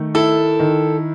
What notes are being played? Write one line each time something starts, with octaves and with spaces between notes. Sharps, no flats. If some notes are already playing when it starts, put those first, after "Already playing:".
Already playing: D#3 A3
E4 A4
D#3